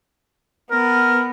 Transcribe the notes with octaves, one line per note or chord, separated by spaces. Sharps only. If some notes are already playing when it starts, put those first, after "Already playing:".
B3 A#4